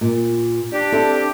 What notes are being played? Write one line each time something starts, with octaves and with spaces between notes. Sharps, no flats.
A#2
D4 G4
C4 E4 A4